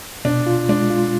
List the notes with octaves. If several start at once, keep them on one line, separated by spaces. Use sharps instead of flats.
B2 D4
F4
G#3 D4
F4